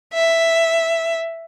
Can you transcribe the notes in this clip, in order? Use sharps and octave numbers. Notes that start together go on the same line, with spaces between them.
E5